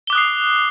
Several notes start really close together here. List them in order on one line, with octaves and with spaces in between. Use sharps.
G7 D6 F#6 D#6 C7